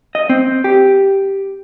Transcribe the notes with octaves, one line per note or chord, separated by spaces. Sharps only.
D#5
C4
G4